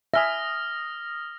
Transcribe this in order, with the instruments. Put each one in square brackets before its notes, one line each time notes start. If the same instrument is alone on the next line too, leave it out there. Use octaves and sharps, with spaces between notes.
[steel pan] E5 G#5 [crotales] D#6 F6 A#6